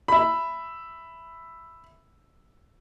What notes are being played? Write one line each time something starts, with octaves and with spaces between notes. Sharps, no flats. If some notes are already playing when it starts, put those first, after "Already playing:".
E5 B5